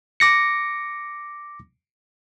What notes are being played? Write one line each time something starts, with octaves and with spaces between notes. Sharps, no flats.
D6 A#6 C#7